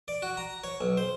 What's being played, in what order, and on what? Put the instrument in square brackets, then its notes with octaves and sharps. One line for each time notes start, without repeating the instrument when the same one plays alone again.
[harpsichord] D5
F#4
A#5
C#5
B1
C5